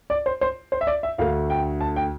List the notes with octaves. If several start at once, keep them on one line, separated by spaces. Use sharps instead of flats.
D5
C5
C5
C5
E5
D5
E5
D2 D3 A3 F5
G5
A5
G5